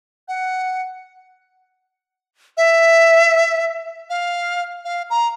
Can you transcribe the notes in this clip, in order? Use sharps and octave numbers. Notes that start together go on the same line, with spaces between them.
F#5
E5
F5
F5
A#5